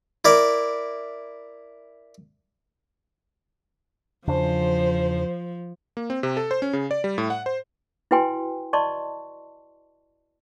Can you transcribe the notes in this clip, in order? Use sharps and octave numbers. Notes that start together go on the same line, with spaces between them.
E4 A#4 D5
E2 C#3 F3 D4 C5
A#3
C4
C3
A4
C5
C#4
C#3
D5
G3
A2
F#5
C5
E4 F#4 B4 G5 G#5 C6
D5 D#5 A5 C6 C#6